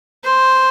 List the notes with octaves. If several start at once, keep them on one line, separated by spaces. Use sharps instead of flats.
C5